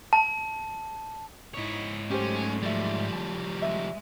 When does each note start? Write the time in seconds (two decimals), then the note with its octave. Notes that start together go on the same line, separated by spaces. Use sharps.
0.13 A5
1.54 G#2 D#4 E4 C#5
2.11 F#3 G#3 A3 C#4 G4 C5
2.63 F3 G3 D5 E5
3.13 A5
3.62 G#3 E5